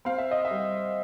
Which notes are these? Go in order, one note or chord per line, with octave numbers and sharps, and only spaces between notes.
C4 F5
E5
D#5
E5
G3